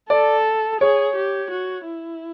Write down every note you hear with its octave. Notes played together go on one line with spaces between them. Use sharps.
A4 D5
G#4 C#5
G4
F#4
E4